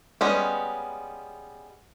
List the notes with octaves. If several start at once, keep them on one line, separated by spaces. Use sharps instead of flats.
G3 G#3 B3 C#4